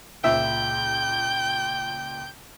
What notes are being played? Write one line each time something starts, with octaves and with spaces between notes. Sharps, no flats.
C#2 A#2 E5 G5 G6